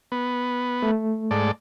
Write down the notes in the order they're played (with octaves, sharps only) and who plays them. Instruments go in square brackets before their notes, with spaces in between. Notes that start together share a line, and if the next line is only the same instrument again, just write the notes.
[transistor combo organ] B3
[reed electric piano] A3
[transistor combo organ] G#2 A4 D5